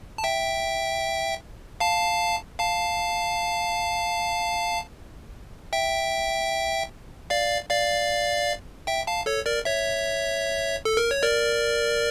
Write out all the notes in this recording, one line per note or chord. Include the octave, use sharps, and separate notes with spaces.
A5
E5 G5
F5 A5
F5 A5
E5 G5
D5 F5
D5 F5
E5 G5
F5 A5
A4 C#5
A#4 D5
C#5 E5
A4
A#4
C#5
A#4 D5